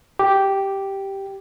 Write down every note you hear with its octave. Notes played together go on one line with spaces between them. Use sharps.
G4